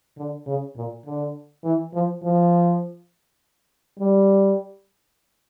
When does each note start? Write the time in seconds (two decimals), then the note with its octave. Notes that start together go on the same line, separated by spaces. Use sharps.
0.17 D3
0.47 C#3
0.76 A#2
1.06 D3
1.64 E3
1.94 F3
2.23 F3
3.99 G3